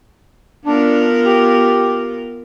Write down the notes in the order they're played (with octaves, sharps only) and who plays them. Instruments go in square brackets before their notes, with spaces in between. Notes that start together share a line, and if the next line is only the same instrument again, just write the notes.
[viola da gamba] B3 F4 A#4 [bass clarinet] D4
[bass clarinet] G4